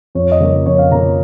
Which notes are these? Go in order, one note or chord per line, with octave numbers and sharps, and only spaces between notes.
F2 C#5
D#5
C#3 F3 A#3 C#5
F2 C#5
F5
C#3 F3 A#3 A#5